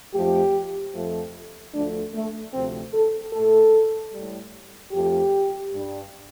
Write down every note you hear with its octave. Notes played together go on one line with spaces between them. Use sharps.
F2 F3 A3 G4
F2 F3 A3
D2 D3 F3 A3 D4
A3
D2 C3 F3 A3 C4
A4
A2 A3 A4
A2 G3
F2 F3 A3 G4
G2 G3